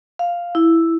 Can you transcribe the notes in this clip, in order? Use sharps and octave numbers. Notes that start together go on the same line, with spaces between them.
F5
E4